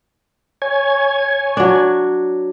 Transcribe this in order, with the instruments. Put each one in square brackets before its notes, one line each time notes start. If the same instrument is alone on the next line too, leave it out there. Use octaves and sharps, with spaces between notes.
[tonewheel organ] C#5 G#5 G#6
[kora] F#3 D4